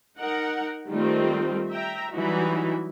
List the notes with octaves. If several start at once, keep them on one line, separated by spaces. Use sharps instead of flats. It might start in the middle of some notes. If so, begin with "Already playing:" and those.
D#4 A#4 F#5
D#3 G3 A3 C4 F4
E5 G5 A#5
E3 F#3 G3 D#4 E4 F#4